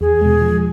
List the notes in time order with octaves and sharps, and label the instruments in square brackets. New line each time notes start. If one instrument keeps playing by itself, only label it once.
[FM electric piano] E2 [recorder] G#4
[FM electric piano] B2 G#3
F3